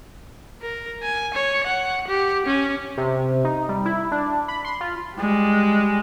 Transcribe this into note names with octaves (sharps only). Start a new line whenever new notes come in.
A#4
G#5
C#5
F#5
G4
C#4
C3
D#4
G3
E4
D4
B5
C6
F4
G3 G#3